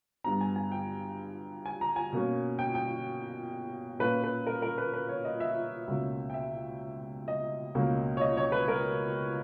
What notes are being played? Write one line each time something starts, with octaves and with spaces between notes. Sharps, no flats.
G2 G3 B3 A#5
G#5
G#5
G5
G#5
A#5
G#5
B2 A#3 C#4
G5
G5
A#2 A#3 C#4 B4
B4
A#4
A#4
B4
B4
C#5
D#5
E5
C#2 B2 A#3 C#4
G5
E5
D#5
C#2 B2 A#3 C#4
C#5
D#5
C#5
B4
A#4